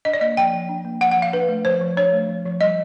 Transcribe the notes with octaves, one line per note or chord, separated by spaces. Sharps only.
D4 D#5
D5
A#3 D#5
F3 G5
F3
D4
A#3
F3 F#5
F#5
F3
F5
D4 B4
A3
F3 C5
F3
D4 C#5
A3
F3
F3
G3 D#5